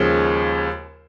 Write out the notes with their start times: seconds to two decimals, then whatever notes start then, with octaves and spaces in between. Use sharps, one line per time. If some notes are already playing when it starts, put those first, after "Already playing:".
Already playing: D#2 C#3 F3 G#3